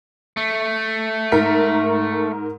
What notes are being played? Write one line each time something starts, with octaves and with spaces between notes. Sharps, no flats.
A3
G#2 A#4 B6